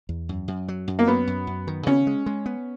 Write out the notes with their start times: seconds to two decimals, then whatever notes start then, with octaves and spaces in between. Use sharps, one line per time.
0.09 E2
0.29 F#2
0.48 F#2
0.68 F#3
0.88 F#2
0.99 A#3
1.08 F#3 B3
1.27 F#2
1.47 F#2
1.68 D#3
1.86 C#3 C#4
2.07 G#3
2.26 G#3
2.46 B3